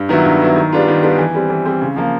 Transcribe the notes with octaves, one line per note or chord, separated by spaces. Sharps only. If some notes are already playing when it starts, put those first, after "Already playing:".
Already playing: G2
D#3 F#3 B3 E4
G2
D#3 F#3 B3 E4
D#3
G3 B3 D4 F4
D#3
G3 B3 D4 F4
E3
G3 C4
E3
G3 C4
C#3
F3 A#3